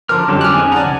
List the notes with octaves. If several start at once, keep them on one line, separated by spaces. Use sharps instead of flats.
D3 F3 A#4 A5 C6 D6 F6
F2 D3 F#3 G3 C#4 G4 A4 D6
G#5 F6 F#6
C4 D#4 G#4
D5 F#5 A5 A#5
C#2 G#5